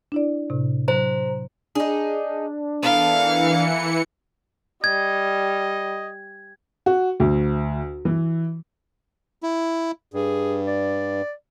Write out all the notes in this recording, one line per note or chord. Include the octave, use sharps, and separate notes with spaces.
D4 E4 D5
A2 C3
F#3 C5 A#5
D4 D#4 G#4
E3 B3 A4 A#4 F5 C#7
G3 D#5 G#6
F#4
D2
E3
E4
G2 G#4
D5